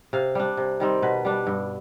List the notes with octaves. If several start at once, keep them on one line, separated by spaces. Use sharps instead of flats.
C3 F5
G3 D4
C3
D#3 G3 C4
B2 B4
G3 D4
G2